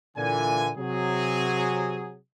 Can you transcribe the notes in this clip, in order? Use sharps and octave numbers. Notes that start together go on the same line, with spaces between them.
A#2 D3 E3 G#5
C3 F#3 G#4